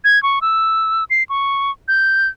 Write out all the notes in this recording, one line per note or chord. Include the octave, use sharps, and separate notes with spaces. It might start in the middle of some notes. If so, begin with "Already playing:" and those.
G#6
C#6
E6
C7
C#6
G6